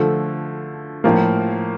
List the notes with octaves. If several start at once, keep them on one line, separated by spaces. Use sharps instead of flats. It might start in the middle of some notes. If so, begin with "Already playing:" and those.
Already playing: D3 F3 A3
A2 F3 A#3